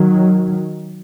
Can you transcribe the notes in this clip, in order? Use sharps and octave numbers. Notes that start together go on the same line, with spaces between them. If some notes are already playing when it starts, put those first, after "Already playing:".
Already playing: D#3 F#3